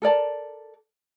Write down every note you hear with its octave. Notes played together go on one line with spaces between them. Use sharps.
A4 A#4 D5 A5